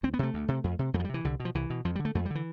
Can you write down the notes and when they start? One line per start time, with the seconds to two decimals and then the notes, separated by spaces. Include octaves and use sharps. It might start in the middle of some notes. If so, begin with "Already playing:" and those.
0.03 D2 C4
0.14 B3
0.19 C3 A3
0.34 D2
0.48 C3
0.64 F2
0.79 C3
0.94 F2 A3
1.00 F3
1.04 G3
1.09 C3 E3
1.24 C2 D3
1.40 B2
1.45 F3
1.55 C2 E3
1.70 B2
1.85 F2 F3
1.95 D3 G3
2.05 A3
2.15 F2 A3
2.25 G3
2.30 D3 E3